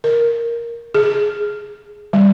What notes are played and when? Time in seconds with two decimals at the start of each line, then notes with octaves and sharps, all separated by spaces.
0.04 A#4
0.94 G#4
2.13 G3